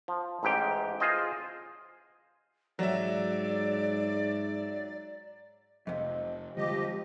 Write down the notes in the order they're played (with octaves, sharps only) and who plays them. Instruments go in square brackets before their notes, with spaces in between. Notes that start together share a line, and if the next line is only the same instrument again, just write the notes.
[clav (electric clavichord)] F3
A1 G#2 G4 G5
F4 G#4 C5 D#5
[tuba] G#2 [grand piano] F#3 E5 [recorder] D5
[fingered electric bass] F1 [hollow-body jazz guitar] F2 C3 [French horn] D#5
[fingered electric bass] D3 G3 G#3 [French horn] F3 [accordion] G4 D#5